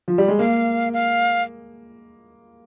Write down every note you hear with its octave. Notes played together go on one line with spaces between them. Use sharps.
F3
G3
G#3
A#3 F5
F5